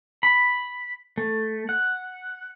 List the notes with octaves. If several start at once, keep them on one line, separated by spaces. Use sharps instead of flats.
B5
A3
F#5